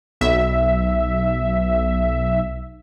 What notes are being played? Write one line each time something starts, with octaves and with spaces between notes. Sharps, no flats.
B1 E5